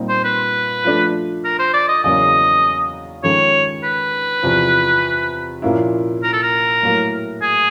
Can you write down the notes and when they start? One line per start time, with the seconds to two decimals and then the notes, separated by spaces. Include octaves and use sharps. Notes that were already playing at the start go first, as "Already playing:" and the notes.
Already playing: A#2 G3 C4 D#4
0.09 C5
0.24 B4
0.84 F3 A3 D4
1.44 A#4
1.59 C5
1.73 D5
1.88 D#5
2.04 E2 C#3 F#3 A#3 D#5
3.23 D#3 G#3 C#4 F4 A4 C#5
3.83 B4
4.42 E2 C3 F3
5.62 A#2 F3 A#3 C#4 E4
6.23 A#4
6.33 A4
6.43 A#4
6.83 A2 F#3 A#3
7.42 G#4